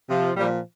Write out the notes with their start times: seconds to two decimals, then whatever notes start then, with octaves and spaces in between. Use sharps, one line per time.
0.09 C3 F3
0.37 A#2 F3 G3